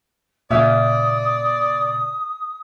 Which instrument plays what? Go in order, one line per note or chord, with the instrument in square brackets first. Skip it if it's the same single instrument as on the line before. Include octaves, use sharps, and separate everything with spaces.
[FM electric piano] A#2 C#3 [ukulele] G#4 E5 F5 [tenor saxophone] D5 [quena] D#6